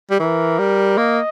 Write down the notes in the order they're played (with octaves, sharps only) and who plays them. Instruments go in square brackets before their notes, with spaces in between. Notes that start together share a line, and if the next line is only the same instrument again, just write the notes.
[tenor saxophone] G3
[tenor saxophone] E3 [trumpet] A#4
[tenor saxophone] G3
[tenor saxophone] A#3 [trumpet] D#5